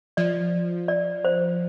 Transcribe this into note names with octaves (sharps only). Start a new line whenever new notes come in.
F3 D5
D5
C5